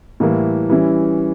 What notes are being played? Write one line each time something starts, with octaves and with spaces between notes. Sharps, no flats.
A2 E3 G3 A#3 E4
E3 G3 C#4 E4